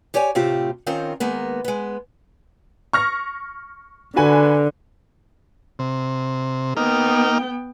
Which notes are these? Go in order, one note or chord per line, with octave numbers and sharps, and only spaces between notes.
G4 C#5 D5 G5 G#5
A2 C3 A3 C4 F4 G4
D#3 C4 C#4 F4 A#4
D#3 G#3 A#3 B3
G#3 B3
C#6 F6 A#6
D3 F#4 B4 G#5
C3
A#3 B3 D#4 G5 F6